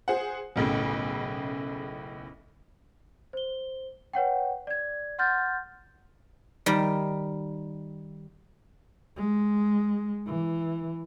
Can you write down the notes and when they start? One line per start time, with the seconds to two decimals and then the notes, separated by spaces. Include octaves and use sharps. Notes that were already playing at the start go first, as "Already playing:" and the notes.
0.08 G#4 C5 F#5
0.56 F#1 B1 A2 C#3
3.33 C5 G7
4.13 B4 C#5 F#5 G5
4.67 D5 G#6
5.18 F#5 C6 F6 G6 A6
6.66 D#3 G3
9.16 G#3
10.27 E3